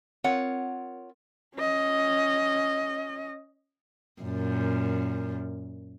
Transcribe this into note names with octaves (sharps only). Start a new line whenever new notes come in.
C4 F4 A#4 C#5 F#5
C#4 D#5
F#2 A#2